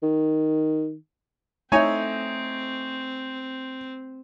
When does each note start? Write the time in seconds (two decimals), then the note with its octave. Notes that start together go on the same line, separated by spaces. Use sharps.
0.03 D#3
1.72 A3 C4 D#4 C#5 E5 G#5